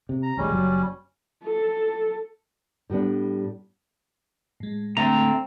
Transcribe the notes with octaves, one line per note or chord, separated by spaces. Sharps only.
C3
A#5
D#1 A1 G3 G#3 C#4
F#1 F#3
A4
A2 G3 B3 D4
A2 G#3
D3 A3 C4 A#5